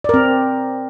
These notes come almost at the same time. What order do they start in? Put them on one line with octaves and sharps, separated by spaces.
D5 A#4 C4